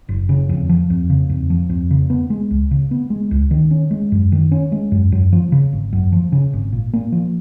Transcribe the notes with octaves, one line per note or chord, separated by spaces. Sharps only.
F#1
C#3
F2
F3
F2
C#3
F2
F3
F2
C#3
B3
G#3
C#2
C#3
B3
G#3
C#2
D#3
C#4
G#3
F#2
D#3
C#4
G#3
F#2
F#2
F3
C#3
G#1
F#2
F3
C#3
G#1
A#2
A#3
F3